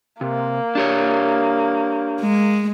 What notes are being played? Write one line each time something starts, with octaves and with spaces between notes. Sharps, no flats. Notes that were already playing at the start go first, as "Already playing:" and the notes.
C3 A#3
D4 G4 C#5
G#3